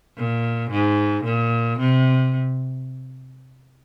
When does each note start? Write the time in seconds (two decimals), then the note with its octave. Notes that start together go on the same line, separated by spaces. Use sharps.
0.17 A#2
0.71 G#2
1.24 A#2
1.79 C3